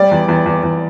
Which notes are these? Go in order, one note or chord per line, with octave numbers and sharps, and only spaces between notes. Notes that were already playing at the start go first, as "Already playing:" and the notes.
Already playing: G3 D5
E2
E2
E2
E2